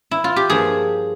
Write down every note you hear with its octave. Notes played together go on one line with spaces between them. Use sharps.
E4
F4
G4
G2 F3 A#3 G#4